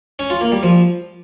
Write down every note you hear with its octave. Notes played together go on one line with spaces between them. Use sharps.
C#4
F4
A#3
G3
F3